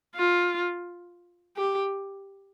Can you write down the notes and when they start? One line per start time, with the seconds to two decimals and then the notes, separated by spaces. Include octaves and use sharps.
0.16 F4
1.57 G4